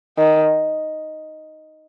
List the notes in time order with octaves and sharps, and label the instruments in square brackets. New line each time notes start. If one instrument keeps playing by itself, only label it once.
[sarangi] D#3